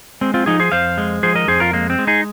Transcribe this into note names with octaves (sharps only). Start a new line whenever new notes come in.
G#3 C4
C4 F4
F3 D#4 G#4
G#4 C5
F2 C5 F5
G#3
F3 G#4 C5
A#4 D#5
F2 G#4 C5
F4 A#4
G#3 A#3
C4
G#3
D#4 G#4